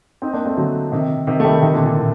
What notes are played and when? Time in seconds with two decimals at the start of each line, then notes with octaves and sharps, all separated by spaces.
0.22 C4 D#4
0.33 A#3 D4
0.45 A3 C4
0.57 D3 F#3
0.92 C3 D#3
1.27 C3 D#3
1.40 A3
1.45 D#3 G3
1.62 C3 D#3
1.74 A#2 D3
1.85 A#2
1.97 A2